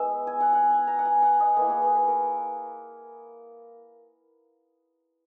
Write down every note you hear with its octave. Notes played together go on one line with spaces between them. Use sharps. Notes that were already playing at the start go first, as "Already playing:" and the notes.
Already playing: G#3 B3 E4 E5
G#5
F#5
F#5
G#5
A#5
F#5
G#5
F#5
D#5
A#3 E4 B4
G#4
B4
B4
A#4